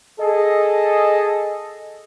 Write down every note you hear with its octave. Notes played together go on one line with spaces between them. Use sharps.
G#4 A4 D#5